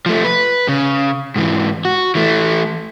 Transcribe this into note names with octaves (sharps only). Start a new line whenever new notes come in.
F3 A3
B4
C#3
G#2 E3
F#4
E3 A3